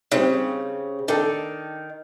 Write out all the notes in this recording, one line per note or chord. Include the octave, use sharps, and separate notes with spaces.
C#3 G3 C4 D#4
D#3 D4 A4